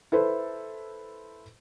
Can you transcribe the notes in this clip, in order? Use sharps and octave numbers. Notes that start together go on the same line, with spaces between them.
E4 A4 B4 C5